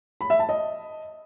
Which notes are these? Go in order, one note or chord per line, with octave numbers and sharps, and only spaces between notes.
B5
E5
A5
D#5